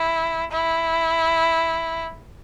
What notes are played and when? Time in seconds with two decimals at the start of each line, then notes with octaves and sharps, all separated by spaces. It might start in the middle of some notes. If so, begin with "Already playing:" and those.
Already playing: E4
0.52 E4